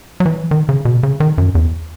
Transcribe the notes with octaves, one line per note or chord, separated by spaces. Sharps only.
F#3
E3
D#3
C#3
B2
C#3
D#3
F#2
E2